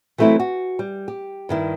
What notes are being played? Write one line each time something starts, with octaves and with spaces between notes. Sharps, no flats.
E3 F#3 A3 C4 E4
F#4
G3
G4
G2 D#3 E4